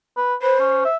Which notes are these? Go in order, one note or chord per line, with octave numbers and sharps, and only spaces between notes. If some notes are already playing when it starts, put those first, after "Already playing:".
B4
B4 C5
C#4
E5